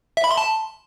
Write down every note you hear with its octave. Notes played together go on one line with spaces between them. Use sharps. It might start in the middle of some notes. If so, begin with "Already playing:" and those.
E5
B5
C6
A5